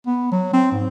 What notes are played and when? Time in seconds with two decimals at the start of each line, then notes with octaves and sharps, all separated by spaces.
0.06 B3
0.32 F#3
0.53 C4
0.72 G#2